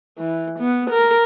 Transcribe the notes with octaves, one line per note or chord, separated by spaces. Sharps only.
E3
B3
A#4